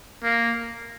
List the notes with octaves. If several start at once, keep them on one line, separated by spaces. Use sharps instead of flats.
A#3